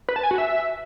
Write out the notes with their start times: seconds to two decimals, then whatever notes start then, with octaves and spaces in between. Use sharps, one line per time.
0.09 B4
0.16 A5
0.23 G#5
0.31 F#4
0.38 E5